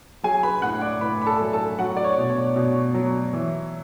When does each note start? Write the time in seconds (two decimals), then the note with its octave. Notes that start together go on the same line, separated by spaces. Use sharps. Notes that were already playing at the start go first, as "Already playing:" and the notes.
0.23 F#3 G#4 G#5
0.43 B4 B5
0.62 A2 F#5 F#6
0.81 D5 D6
1.01 A2 B4 B5
1.22 B5
1.27 A4 A5
1.40 F#3
1.53 A4 A5
1.78 F#3 F#4 F#5
1.97 D5
2.04 C#5
2.18 B2
2.30 C#5
2.56 B2
2.94 F#3
3.33 E3